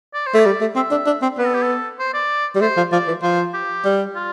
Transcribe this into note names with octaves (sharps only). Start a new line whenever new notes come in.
D5
C5
A3
D5
G3
A3
C4 E5
D4
D4
C4
B3 B4
A4
G4
A4
C5
D5
G3
A3 C5
F3
F3 D5
E3
F3 C5
G4
G3
F4